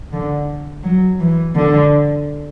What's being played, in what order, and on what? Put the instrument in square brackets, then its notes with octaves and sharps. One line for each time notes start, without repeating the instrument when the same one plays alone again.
[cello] D3
F#3
E3
D3